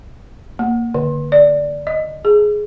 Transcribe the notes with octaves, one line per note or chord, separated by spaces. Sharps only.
A#3
D3
D5
D#5
G#4